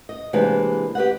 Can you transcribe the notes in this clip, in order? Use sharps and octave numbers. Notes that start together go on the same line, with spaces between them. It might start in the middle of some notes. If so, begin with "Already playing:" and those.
D#5
C3 E3 G#3 A#3 D4 B4
G4 B4 D#5 F#5